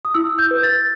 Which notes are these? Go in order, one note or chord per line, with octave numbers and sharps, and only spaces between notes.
D#6
E4 E6
G6
B4
A6